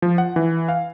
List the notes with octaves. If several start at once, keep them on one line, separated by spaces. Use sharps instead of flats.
F3
F#5
E3
F5